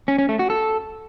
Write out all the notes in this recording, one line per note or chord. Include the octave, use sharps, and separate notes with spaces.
C#4
C#4
A3
F#4
A4